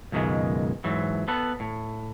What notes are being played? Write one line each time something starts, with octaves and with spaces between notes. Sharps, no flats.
C#2 F#2 B2 D#3 G#3
G#2 E3 F#3
B3 A4 B4
A2